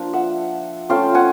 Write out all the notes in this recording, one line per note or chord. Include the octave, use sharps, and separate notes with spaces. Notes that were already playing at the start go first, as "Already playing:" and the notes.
Already playing: F3 A#3 D4
E5 F#5
A3 C#4 F4 F5 G5
F#5 G#5